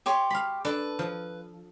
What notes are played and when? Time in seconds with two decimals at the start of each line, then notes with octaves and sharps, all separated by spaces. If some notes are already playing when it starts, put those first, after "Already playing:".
0.06 G4 C#5 C6
0.30 F5 B5
0.65 D4 A4 B4
0.99 F3